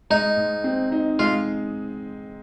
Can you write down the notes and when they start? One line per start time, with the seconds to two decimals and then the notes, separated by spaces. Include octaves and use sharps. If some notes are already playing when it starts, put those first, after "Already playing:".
0.10 G#3 D#4
0.37 G#2
0.64 C4
0.92 D#4
1.19 G#3 F4